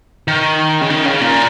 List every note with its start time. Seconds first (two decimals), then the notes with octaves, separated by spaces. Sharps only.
0.28 D#3
0.81 C#3
0.90 D#3
1.05 C#3
1.21 A#2